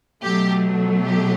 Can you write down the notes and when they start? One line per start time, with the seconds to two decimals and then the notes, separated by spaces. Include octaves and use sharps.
0.23 B2 F#3 A3 G4
1.03 G4